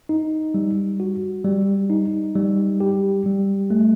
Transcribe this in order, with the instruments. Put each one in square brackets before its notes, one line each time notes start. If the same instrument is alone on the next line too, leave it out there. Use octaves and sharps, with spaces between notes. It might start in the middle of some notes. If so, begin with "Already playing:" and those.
[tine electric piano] D#4
G3
F#4
G3
D#4
G3
G4
G3
A3